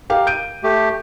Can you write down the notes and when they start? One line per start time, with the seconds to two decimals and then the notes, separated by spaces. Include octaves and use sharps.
0.10 G4 A#4 F5
0.27 G6 D7 D#7
0.64 A3 G4